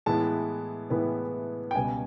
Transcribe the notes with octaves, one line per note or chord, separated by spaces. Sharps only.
A2 E3 G#3 B3 A5
A2 E3 G#3 B3
G5
C#2 B2 G3 G#5